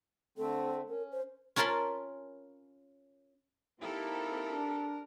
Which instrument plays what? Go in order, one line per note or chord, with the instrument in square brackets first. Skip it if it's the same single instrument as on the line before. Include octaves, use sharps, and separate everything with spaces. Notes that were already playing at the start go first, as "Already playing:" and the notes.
[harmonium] D3 A3 C4 [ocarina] A4
[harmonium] C#4 [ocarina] A#4
[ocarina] C5
[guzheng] C#4 F4 A#4 A5 B5 C6
[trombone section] A#3 D#4 E4 [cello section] C4 G4 A4 [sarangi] A#4
[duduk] D4